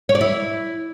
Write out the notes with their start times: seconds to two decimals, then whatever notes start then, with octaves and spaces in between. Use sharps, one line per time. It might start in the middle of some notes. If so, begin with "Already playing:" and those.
0.09 C#5
0.15 D5
0.21 E4